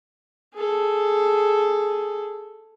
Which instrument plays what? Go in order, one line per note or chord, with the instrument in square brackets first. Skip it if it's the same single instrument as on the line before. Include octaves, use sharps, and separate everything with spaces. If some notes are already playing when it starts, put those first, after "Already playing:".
[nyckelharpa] G#4 A4